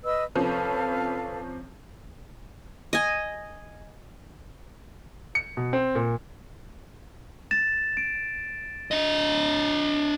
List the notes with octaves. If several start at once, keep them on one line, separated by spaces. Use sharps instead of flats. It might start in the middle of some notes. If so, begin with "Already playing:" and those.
B4 D#5 E6
C3 F3 C#4 A4 B4 F5
D#5 G#5
C#7
B2
C4
A#2
A6 E7
D7
D4 D#5